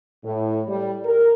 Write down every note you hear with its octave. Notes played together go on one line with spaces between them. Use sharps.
A2
G3
A#4